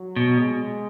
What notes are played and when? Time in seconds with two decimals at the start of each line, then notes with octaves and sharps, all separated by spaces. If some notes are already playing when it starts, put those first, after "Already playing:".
Already playing: F#3
0.16 B2
0.38 G#3